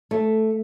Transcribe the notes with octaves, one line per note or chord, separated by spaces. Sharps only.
A3